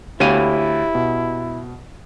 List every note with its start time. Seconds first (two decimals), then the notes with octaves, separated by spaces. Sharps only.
0.20 D2 E4 G4 C#5 F5 D#7
0.95 B2